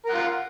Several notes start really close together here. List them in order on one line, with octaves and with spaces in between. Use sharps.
A#4 F#5 F4